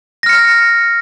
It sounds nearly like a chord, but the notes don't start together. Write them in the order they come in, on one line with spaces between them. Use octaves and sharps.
A#6 F6 C#7